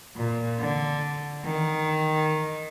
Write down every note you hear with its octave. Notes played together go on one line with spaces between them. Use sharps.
A#2
D3
D#3